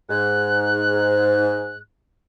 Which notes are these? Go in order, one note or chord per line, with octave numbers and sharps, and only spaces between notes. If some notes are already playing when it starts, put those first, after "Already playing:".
G#2 F#6